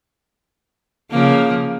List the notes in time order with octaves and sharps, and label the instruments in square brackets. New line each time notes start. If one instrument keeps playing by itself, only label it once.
[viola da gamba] C#3 F3 A#3